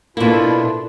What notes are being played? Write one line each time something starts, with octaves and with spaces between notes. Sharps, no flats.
B2 A#3 D4 E4 F4 A4 B4